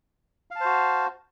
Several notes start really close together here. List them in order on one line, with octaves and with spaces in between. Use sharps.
F5 A5 C5 F#4